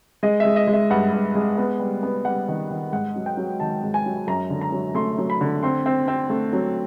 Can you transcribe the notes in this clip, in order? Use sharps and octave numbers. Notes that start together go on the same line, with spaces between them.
G#3 D#5
G#3 E5
D#5
G#3
E5
G2 F#5
G2
G#3
B3
G3
B3
G3 F#5
D#3
D#3
G#2 F#5
F#3
G5
F#3
D#3 A5
G#2
G#5
F#3
F#2 A#5
D3
A#5
F#3
A3 C6
F#3
B5
D3
C4 C6
C4
C4
A3
F#3